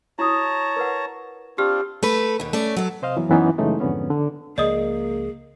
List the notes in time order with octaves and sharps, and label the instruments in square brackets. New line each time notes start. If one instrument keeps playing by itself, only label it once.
[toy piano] E4 F#4 D#6 [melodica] C#5 A5 A#5
[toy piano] A#4 B4 F#5
[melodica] C4 D4 F4 [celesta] G4 F6
[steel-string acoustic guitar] A3 A4 B4
D#2 B2
A3 C#4 D5
F#3 A4
[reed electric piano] C3 C5 D#5 F5
F#2 E3 F#3 B3
F#2 E3 B3 C#4 D#4
F#2 C#3 E3 G#3 A3 D#4
F2 G#2 D3 B3 C#4
D3
[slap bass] C#2 F3 [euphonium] A#3 [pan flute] G#4 [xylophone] D5 D#5 D#6